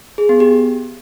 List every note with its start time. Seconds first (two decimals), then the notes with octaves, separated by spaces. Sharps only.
0.18 G#4
0.29 B3
0.40 G4